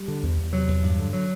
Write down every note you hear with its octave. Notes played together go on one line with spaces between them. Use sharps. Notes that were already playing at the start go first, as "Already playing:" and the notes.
Already playing: G3
D3
E2
E2
C3 F#3
E2
G2
D3
F#3